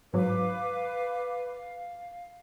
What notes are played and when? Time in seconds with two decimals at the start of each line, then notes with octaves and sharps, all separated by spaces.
0.13 G#1 G#2 F#3 B4 F5 D6
1.48 F5